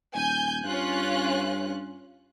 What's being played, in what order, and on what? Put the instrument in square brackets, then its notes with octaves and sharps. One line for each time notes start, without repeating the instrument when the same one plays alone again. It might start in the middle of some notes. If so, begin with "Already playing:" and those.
[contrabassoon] D#1 [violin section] G#5 G6
[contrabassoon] G2 [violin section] C#4 F4 F#6